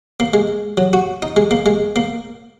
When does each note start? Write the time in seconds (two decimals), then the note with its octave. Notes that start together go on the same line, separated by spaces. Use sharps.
0.20 A#3
0.34 G#3
0.77 F#3
0.93 F#4
1.22 D#4
1.36 G#3
1.51 A#3
1.66 G#3
1.96 A#3